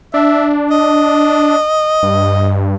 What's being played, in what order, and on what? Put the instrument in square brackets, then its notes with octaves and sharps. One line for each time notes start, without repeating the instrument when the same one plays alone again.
[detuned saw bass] D4 [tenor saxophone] E5
[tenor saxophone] D#5
[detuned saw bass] G2